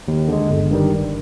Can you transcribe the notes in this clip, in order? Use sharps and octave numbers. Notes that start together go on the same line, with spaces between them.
D#2
D3 G#3
G1
G2 D#3 G3
G1